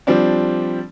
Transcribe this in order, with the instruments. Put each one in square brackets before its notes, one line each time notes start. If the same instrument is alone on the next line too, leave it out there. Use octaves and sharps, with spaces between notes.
[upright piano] F3 G3 C4 D4